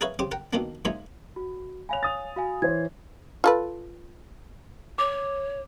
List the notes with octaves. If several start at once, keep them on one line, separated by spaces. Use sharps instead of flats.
G#4 A#4 B4 C#5 E5 F5
C#3 G4 C5 D6
A#4 F#5 G5
B2 D#3 A#3 D4
A#2 F3 G#3 D#4 E5 G#5
F#4
C#5 F5 G#5 B5 F7
D#6 A6
F#4 F5 G#5
E3 C5 C#5 G#6
F4 A4 B4
C#5 D6